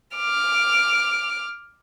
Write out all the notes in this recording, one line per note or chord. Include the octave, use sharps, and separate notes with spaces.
D6 F6